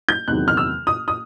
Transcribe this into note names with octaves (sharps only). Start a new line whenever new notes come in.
G6
E2 C3 D#3 F#3 F#6
F6
E6
D#6
D#6